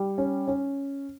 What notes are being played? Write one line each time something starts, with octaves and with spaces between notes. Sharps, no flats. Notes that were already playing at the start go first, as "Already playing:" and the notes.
Already playing: G3
C#4
C#4